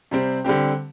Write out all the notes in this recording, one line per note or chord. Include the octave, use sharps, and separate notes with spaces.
C3 G3 C4
D3 G3 C4 G4